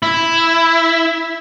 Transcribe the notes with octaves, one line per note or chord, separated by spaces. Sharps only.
E4